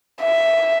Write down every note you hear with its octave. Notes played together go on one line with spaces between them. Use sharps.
E5